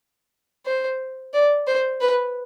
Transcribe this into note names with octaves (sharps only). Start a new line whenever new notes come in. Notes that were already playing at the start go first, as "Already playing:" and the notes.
C5
D5
C5
B4